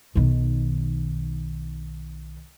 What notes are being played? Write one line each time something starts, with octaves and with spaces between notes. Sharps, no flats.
B1 D#3